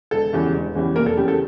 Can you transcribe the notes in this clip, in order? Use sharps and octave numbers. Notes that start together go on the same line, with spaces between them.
E1 A4
E2 C#3 E3 G3
E1
E2 C#3 E3 G3
F1 A#3 A#4
A4
E2 C#3 G3 G4
A4